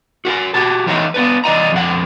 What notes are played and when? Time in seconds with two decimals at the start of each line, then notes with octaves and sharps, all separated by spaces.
0.25 F#4 G4 A#4
0.54 F#4 G4 A5
0.86 E3 A3 D#4 C#5
1.14 B3 D4 B4
1.44 E3 D5 D#5 A#5
1.72 F2 D3 F#5